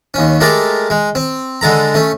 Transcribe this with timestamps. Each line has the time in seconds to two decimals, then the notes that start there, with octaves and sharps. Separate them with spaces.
0.14 D#2 C#4
0.40 G#3 A3 G4 A4 A#4
0.90 G#3
1.15 C4
1.61 D3 G#3 A4 A#5
1.94 A3 C#4